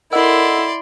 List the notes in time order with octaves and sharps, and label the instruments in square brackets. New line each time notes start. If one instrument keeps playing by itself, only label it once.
[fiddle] E4 [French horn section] A4 A#4 [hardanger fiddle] D5 C6 [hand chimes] D#5 F#5 E6